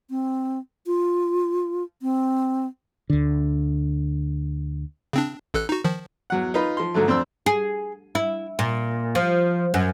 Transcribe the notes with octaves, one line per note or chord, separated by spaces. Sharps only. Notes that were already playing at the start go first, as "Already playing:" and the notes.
C4
F4
C4
D2 D3
C#3 C4 D4
A1 A4 F#6
D#4 F#4
D#3 F3
E2 F#3 F#5
D#4 F4 B4
F3 C6
G#2 D3 F#3 A3
F2 C4 D4 C5 E6
G#4
E4
A#2
F3
F#2